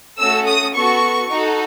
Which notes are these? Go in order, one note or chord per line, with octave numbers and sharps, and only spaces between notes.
A3 C#4 F#4 A4 E6
D#6
B3 F#4 A4 C#6
D#4 F#4 A4